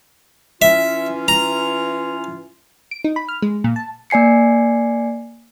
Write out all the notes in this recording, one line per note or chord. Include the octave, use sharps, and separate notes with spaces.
E3 C#4 F4 E5
A#5
D7
D#4
B5
F6
G#3
A#2
A5
A#3 D5 G#5 C7 C#7